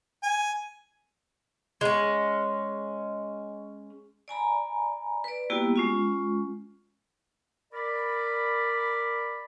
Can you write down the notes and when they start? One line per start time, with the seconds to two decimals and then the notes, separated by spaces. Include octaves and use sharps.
0.23 G#5
1.81 G#3 C#4
4.28 D5 G#5 A#5 B5
5.24 B4 D5
5.50 G3 A#3 B3 E4 F#4 G4
5.76 G#3 C#4 F4
7.73 A#4 D5 B5